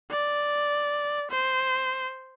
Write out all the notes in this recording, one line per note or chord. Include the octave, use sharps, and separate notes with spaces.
D5
C5